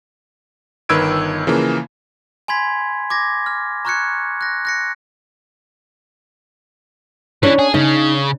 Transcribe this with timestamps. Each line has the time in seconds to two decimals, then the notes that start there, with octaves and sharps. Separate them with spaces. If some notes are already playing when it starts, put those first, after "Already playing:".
0.89 G1 D#3 B4 E6 G#6 D7
1.47 C#3 E3 F3 A#3
2.48 G#5 B5 C6 G#6 B6
3.10 D6 G#6 A#6
3.46 F6
3.85 A#5 C#6 F6 F#6 G#6 C#7
4.41 F#6 A#6
4.65 F#6 A#6 C#7
7.43 E3 C#4 D4
7.59 G#4
7.74 C#3 D#4